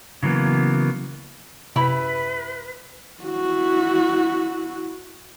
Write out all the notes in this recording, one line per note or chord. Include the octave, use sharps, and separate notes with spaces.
C#3 E3 F#3 A#3 B3
F#2 C3 E4 G4 B4 B5
E4 F#4